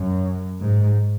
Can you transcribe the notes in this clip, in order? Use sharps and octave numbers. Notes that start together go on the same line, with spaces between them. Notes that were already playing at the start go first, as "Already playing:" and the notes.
Already playing: F#2
G#2